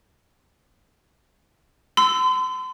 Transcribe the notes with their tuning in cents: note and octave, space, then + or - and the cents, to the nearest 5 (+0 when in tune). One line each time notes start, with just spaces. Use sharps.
C6 -40 E6 +0